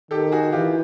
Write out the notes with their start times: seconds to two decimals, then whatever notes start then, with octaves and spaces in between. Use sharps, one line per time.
0.11 D#3 G4 A4
0.32 F#4 G#4
0.52 E3 F4 G4